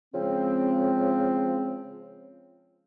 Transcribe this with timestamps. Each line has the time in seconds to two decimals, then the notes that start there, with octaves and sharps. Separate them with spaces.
0.15 C#3 F3 G#3 C4